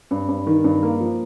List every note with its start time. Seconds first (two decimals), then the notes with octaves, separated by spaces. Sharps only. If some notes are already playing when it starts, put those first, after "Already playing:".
0.11 G2
0.28 G2
0.46 D#3
0.64 G2
0.83 A#3
1.00 F3